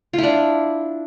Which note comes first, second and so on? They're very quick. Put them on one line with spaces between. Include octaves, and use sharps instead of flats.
F4 E4 D4